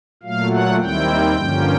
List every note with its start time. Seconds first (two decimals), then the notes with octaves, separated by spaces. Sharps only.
0.23 A#2 F#3 A3 F5
0.51 F#5
0.79 D#2 D#3 G3 C4 E4 G5
1.35 G2 D3 F3 A#3 C#4